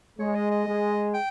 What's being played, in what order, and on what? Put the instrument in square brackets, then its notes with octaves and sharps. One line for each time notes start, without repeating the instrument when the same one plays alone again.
[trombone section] G#3 [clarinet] C#5
[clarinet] D#5
D#5
[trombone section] G#3
[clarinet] G5